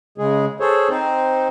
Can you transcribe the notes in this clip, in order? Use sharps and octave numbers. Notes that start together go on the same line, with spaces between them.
C#3 G#3 G#4
G#4 A4 C5 C#5
C4 D#4 C5